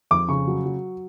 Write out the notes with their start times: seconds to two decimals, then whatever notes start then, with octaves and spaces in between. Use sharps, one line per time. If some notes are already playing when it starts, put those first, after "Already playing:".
0.11 F2 D6
0.29 C#3 C#6
0.48 F#3
0.66 F#3